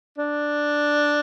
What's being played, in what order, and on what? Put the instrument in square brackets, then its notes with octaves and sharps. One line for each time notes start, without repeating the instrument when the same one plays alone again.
[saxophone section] D4